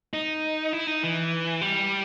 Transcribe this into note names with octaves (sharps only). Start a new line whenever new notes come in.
D#4
E4
D#4
E3
G3